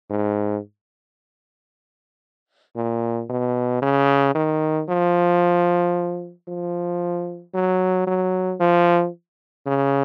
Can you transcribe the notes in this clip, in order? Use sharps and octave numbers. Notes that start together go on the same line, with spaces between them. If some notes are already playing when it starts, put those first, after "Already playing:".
G#2
A#2
B2
C#3
D#3
F3
F3
F#3
F#3
F3
C#3